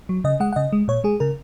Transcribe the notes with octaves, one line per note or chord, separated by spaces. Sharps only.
F#3
C#3 D#5
G#3 F#5
F#5
C#3 D#5
G#3
A#2 C#5
G#3 G#4
C#3 A#4